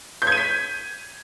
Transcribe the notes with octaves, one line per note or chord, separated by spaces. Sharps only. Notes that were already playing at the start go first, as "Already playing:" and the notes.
G6
G#6
D#7
B6